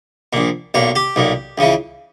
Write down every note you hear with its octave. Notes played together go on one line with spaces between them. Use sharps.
A#1 A#2
B1 A#2 C#5
G4
B1 A#2
C#2 C#3 E3